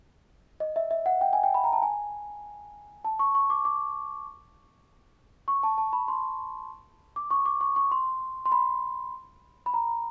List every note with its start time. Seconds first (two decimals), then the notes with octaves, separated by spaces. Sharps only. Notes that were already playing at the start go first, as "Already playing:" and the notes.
0.60 D#5
0.76 E5
0.91 E5
1.06 F#5
1.21 G5
1.33 G#5
1.43 G5
1.54 B5
1.64 A#5
1.73 A5
1.82 G#5
3.05 A5
3.19 C#6
3.35 C#6
3.50 D6
3.65 D6
5.48 C#6
5.63 A5
5.78 A5
5.93 B5
6.08 C6
7.16 D6
7.31 C#6
7.46 D6
7.61 C#6
7.76 C#6
7.92 C6
8.46 C6
8.52 B5
9.66 B5
9.74 A#5